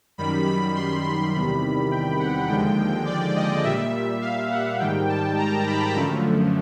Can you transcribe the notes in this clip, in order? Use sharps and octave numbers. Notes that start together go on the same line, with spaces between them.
F#2 D#3 G3 B5
B5
C6
C6
E2 C3 D#3 G3 B5
G5
F#5
D#2 D3 F3 G#3 G5
D5
D#5
A#2 G3 E5
F5
F#5
G#2 D#3 G3 G5
A5
A#5
B5
F#2 D3 F3 A3